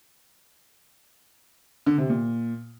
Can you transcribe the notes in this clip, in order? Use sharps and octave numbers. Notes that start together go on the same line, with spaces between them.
D3
C3
A#2